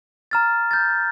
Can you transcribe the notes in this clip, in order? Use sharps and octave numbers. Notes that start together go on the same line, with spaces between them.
A#5 F6 A6
G6 A6